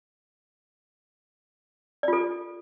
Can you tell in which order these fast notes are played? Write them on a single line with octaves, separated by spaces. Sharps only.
D5 F4 A4